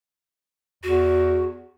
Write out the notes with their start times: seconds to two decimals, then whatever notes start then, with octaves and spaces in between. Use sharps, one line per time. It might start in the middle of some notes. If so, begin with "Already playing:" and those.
0.83 E2 F#4